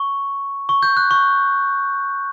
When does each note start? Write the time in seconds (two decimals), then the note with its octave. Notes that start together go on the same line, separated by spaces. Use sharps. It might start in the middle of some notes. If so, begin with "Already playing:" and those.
Already playing: C#6
0.69 C#6
0.83 G6
0.97 F#6
1.11 C#6